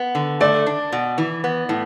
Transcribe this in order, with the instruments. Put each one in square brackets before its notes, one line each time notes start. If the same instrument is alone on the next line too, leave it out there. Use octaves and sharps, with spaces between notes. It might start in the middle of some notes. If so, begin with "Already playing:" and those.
Already playing: [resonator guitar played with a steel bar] B3
D3
[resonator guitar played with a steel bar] A3 [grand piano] D5
[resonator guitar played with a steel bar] D4
B2
E3
B3
A2